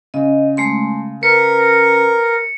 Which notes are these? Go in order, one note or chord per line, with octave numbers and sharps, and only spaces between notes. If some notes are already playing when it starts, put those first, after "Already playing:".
C#3 D#5
G#3 A3 C6
A#4 B4 C#7